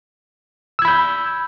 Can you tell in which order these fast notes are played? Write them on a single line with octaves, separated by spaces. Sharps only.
E6 G#6 B5 G6